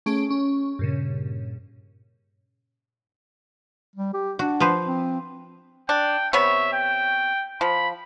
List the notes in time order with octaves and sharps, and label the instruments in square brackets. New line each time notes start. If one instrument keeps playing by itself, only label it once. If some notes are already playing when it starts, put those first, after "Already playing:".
[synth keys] A3 C#4 G#4 D7
C#4
G2 A#2 C#3
[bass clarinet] G3
G4
[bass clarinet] D4 [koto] F#4
[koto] F3 B4 C5
[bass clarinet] C4
[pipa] D4 [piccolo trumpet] G5
[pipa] C3 B3 C#5 [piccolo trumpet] E5
[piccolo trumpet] G5
[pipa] F3 [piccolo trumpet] B5